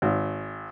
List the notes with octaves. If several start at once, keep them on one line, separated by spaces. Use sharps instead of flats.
G#1